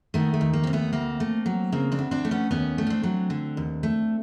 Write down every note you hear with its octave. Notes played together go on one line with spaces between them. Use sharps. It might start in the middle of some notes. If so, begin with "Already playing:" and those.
D#3 A3 B3
A3
D#2
A#3
D#2 C4
A3 B3
D2 A#3 C4
A3
F#3
C#3 A#3 C4
C4 D4
D2
C4 D4
A3
B3 C#4
D#2 B3 C#4
A3
C#4
C4 D4
F#3
D3
D#2
A3